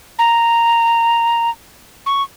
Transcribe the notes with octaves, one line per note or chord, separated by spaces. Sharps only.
A#5
C#6